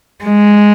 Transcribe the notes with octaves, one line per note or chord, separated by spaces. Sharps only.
G#3